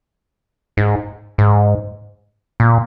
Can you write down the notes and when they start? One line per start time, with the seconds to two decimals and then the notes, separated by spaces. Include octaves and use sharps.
0.77 G#2
1.38 G#2
2.60 A#2